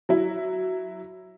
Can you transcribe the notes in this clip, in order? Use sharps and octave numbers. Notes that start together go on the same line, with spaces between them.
F#3 E4